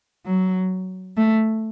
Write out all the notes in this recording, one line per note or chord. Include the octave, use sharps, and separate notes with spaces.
F#3
A3